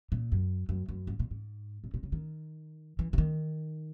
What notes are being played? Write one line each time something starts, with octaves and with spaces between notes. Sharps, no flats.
A#2
F#2
F#2
F#2
G#2
A#2
G#2
A#2
A#2
C#3
D#3
E3
C#3
D#3